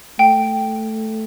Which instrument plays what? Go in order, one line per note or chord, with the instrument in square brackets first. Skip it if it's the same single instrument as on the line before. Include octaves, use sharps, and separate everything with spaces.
[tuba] A3 [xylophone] G5